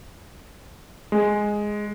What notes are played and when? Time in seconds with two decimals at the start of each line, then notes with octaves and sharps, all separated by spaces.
1.12 G#3